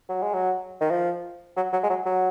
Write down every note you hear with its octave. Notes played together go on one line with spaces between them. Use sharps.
F#3
G#3
F#3
D#3
F3
F#3
F#3
G#3
F#3
F#3